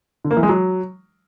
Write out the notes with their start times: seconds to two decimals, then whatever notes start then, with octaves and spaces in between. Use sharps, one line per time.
0.24 D3
0.31 A#3
0.37 E3
0.43 G#3
0.49 F#3